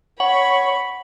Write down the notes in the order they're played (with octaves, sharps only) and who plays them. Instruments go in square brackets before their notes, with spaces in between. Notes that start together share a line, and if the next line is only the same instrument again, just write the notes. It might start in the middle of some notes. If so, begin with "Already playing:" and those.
[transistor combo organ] C#5 C#6 [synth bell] F#5 F#7 [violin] B5